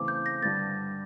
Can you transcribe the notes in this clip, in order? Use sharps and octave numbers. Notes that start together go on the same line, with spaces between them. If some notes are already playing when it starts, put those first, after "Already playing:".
Already playing: E2 C#3 E3 A3 C4 D6
G6
A#6
G2 D3 G3 A6